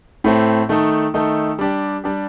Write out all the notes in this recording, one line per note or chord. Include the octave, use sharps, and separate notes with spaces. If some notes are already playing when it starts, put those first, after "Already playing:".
A2 A3 C4
D#3 A3 D#4 A4
D#3 A3 D#4 A4
G3 D4 G4
G3 D4 G4